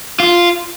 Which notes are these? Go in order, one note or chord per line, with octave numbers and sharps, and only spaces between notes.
F4